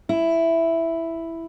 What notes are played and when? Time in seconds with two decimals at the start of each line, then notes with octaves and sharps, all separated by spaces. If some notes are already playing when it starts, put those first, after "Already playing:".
0.09 E4